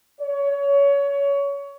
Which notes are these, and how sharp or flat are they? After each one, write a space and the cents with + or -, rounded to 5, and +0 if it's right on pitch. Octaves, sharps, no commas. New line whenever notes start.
C#5 +25